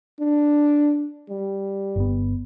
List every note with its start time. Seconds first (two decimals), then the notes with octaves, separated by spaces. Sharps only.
0.20 D4
1.30 G3
1.96 G1 B3